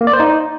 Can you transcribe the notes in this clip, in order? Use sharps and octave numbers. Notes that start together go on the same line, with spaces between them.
A#3
D5
C5
D#4